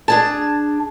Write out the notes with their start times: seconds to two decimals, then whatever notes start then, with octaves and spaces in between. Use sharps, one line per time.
0.08 D4 G#4 A5